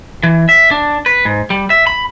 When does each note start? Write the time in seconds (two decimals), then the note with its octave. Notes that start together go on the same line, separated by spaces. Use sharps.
0.23 E3
0.49 E5
0.71 D4
1.06 B4
1.25 G#2
1.50 G3
1.70 E5
1.87 B5